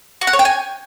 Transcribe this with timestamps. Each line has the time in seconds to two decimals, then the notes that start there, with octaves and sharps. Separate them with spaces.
0.21 F#4
0.27 F#5
0.33 C#5
0.39 G5
0.45 G#5